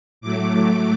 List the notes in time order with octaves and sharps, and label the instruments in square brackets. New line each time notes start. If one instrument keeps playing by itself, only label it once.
[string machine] A2 F#3 A3 D6